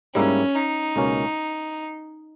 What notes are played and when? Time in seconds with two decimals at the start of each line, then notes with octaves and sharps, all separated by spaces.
0.15 G#2 G3 A#3 C#4 E4
0.56 D#4
0.96 C#2 B2 A#3 C#4